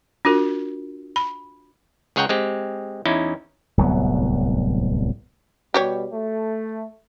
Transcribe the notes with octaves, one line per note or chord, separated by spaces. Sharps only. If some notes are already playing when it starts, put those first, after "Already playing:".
D4 F4 F#4 A#4
B5
C#2 G#4 C#5 F#5 G5 A#5
G#3 C4 G4
E2 C#4 D#4 E4
D1 C2 F#3 B3
B2 G3 F#4 G4 C#5
A3